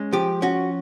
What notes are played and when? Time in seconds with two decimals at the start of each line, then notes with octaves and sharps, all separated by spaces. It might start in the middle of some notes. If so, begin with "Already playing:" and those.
Already playing: G#3 C#4
0.13 F3 G4
0.42 C#4 F#4